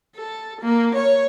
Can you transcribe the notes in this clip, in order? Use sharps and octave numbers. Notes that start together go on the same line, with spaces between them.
A4
A#3
C#5